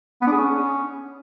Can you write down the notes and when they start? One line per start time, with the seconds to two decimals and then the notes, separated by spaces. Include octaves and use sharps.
0.22 B3
0.27 D4
0.32 G#4
0.37 C#4